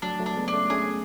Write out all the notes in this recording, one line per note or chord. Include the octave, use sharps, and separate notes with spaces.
F#3 A3 D4
F#3 A3
D4
G#3 B3
D4
A3 C#4
A3 C#4 G#4